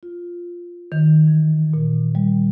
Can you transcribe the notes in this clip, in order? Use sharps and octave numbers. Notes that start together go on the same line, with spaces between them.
F4
D#3
E3
A#2
G3